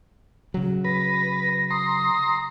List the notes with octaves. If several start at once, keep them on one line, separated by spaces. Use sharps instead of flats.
C#3 F#3
B4 A#6
A#5 C6 D#6